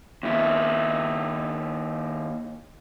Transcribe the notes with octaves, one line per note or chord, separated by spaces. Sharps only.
D#2 E4